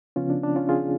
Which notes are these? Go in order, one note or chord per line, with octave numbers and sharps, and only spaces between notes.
C#3 F3 B3 C#4 F4
D4
D4
C#4 F4
F4 G#4